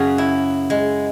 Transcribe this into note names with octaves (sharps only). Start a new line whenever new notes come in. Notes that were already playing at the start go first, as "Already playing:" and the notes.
Already playing: F#2 C#3 F#3 G#4
E4
G#3